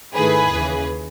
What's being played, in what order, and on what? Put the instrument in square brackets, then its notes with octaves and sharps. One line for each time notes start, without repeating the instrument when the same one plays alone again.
[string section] G#2 D#3 A3 E4 G#4 B4
D#2 C#3 E3